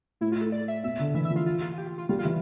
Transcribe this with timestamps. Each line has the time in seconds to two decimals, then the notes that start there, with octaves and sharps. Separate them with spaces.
0.21 A2 E4
0.32 F4
0.41 A4
0.52 D5
0.68 E5
0.84 B2 E5
1.00 D3
1.14 E3 E5
1.25 E5
1.30 F3
1.36 F4
1.46 F4
1.61 F4
1.73 F4
1.78 G4
1.87 F4
1.98 F4
2.09 G3 F4
2.19 F4
2.25 E3